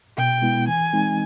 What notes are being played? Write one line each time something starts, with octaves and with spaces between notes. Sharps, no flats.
B2 G5
G#3 B3 E4
E3 G#5
G#3 C4 D#4